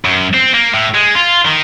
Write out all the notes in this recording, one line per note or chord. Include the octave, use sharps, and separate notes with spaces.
F#2
C4
A#3
A2
G#3
F4
D#3